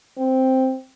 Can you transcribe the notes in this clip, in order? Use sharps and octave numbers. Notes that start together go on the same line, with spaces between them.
C4